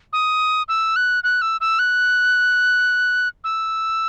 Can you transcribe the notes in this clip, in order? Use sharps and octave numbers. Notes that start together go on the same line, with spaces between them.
D#6
E6
F#6
F#6
E6
E6
F#6
E6